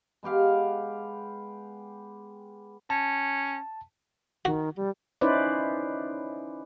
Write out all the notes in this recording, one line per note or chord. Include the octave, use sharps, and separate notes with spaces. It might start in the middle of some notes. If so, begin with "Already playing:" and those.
G#3 B3 G4 F5
C#4 A5
D#3 F#4
G3
C#4 D#4 E4 B4 C5 D5